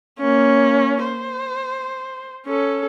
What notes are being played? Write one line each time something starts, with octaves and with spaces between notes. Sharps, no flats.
A#3 C#4
C5
C#4 A4